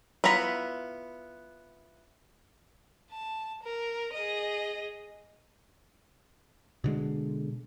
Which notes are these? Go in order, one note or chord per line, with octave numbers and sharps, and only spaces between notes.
B3 E4 F4 A#5 B5
A5
A#4
G#4 D#5
B2 D3 G#3